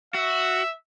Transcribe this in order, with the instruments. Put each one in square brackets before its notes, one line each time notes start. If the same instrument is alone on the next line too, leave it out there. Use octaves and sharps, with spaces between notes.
[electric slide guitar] F#4 [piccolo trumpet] E5